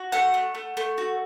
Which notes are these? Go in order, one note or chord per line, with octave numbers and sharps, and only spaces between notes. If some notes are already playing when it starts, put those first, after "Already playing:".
Already playing: F#4
A3 F#5
A3
A3
A3
F#4